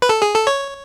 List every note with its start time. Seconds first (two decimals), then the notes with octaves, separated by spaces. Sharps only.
0.02 B4
0.09 A4
0.22 G#4
0.35 A4
0.47 C#5